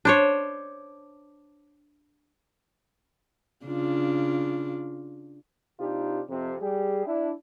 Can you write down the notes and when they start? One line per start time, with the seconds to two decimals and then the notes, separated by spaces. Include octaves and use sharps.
0.05 D4 C5 C#5
3.66 C#3 D4 F4
5.80 C3 D4 D#4 F4 G4
6.29 F2 C3
6.61 G3 G4 G#4
7.06 D4 E4